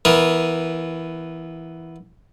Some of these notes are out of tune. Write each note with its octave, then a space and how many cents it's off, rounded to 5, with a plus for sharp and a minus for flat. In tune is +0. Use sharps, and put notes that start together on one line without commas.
E3 +0 B3 +0 A#4 +20